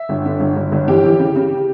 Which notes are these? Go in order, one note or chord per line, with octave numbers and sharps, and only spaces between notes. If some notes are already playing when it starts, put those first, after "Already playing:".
Already playing: E5
G1
D3
G1
G1
G1
E3 G4
E3
C#3
C#3